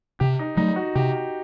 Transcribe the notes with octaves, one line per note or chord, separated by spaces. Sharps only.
C3 G4
D#4
F#3 A3 D#4
F#4
C3 G4